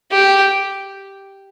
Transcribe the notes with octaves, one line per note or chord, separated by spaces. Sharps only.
G4